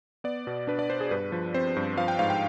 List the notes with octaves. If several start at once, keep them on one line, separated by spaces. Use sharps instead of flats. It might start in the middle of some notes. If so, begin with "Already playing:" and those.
B3 D5
B2
D4 B4
D5
D4 C5
G#4
G2 B4
F3
C4 C5
G2
F3 F5
G5
G#2 F5
G5